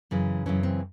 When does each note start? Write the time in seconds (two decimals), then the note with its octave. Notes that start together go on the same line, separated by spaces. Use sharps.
0.11 F#2 C#3 E3
0.46 F#2 C#3 E3 C#4
0.63 C4